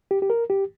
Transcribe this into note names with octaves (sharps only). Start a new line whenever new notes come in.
G4
G4
A#4
G4